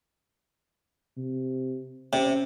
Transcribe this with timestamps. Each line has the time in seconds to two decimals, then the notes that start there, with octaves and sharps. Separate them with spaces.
1.17 C3
2.13 C3 C#4